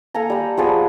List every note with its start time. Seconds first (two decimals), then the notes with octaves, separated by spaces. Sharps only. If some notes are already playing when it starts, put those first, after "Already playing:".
0.14 A#3 A4 G#5 A#5
0.30 G3 G4
0.57 F3 B3 G#4 D5